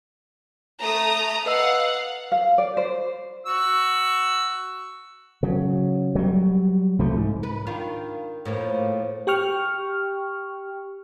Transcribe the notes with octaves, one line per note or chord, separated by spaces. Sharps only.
A3 A#5 D#6
B4 D#5 F5 F#5 E6
F5
D5
C5
F#4 C#6 E6
C#3 F#3
F#3 G3
C2 F3 A3
G#2
B4
D#3 D4 F4
A2 F3 A#3
G4 G5 C#6 F6